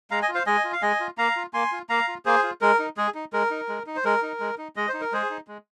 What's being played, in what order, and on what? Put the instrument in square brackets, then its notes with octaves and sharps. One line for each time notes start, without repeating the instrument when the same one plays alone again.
[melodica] G#3 F5 A#5
D#5 G#5
F4
C5 F5
G#3 D#5 G#5
F4
F5
G#3 D#5 G#5
F4
A#3 F5 A#5
F4
A#3 G#5 C6
F4
A#3 F5 A#5
F4
A#3 G#4 C5
F4
G#3 A#4
D#4
G#3 G#4
D#4
G#3 A#4
D#4
G#3
D#4
C5
G#3 A#4
D#4
G#3
D#4
G#3 D#5
C5
D#4
A#4
G#3 G#4 C5
D#4
G#3